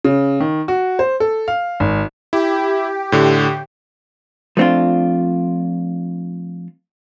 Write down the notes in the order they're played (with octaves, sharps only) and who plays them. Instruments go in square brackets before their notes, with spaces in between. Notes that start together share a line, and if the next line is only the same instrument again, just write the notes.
[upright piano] C#3
D#3
F#4
C5
A4
F5
G#1
[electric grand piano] E4 [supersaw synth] G4
[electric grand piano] A2 D3
[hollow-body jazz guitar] F3 A3 C4 D4 F4